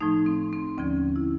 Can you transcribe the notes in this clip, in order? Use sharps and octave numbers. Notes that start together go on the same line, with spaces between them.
A2 F3 A3 D#4
C4
C4
D#2 D3 F3 C#4
E4